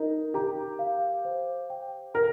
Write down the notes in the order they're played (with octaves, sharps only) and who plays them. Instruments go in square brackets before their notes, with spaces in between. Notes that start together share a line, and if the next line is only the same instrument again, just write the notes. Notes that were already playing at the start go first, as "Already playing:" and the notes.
Already playing: [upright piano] D#4 [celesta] A#4
[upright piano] G4 [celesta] A#5
[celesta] F5
C5
G5
[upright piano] A#4 [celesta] A#5